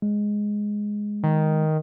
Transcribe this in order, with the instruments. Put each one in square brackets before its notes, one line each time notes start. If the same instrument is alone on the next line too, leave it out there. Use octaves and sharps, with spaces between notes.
[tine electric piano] G#3
[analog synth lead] D#3